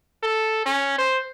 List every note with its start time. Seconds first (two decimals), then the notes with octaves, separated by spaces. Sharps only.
0.23 A4
0.66 C#4
0.98 C5